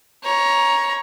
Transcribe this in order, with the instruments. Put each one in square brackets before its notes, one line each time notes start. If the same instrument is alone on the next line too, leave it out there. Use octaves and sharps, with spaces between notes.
[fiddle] C#5 A#5